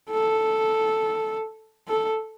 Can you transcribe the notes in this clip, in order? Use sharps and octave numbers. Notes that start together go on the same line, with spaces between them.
A4
A4